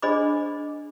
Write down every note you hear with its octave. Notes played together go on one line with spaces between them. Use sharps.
D4 G#4 C5 D#5 B5 D6